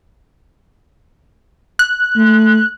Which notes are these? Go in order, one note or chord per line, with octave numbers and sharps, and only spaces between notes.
F#6
A3